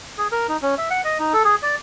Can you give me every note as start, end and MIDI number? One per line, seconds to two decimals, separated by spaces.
0.18 0.28 68
0.32 0.47 70
0.49 0.57 63
0.62 0.75 61
0.78 0.89 76
0.90 1.01 78
1.05 1.18 75
1.19 1.33 63
1.33 1.43 69
1.45 1.55 68
1.63 1.76 74